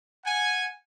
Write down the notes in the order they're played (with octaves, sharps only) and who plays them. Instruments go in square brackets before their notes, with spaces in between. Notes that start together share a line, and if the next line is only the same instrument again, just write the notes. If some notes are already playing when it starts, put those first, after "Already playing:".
[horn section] F#5 G#5